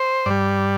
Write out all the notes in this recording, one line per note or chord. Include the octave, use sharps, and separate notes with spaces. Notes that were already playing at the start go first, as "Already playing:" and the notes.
Already playing: C5
G2 G3 D5